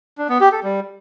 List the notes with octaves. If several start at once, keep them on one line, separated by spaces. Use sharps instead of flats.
D4
B3
G4
A4
G3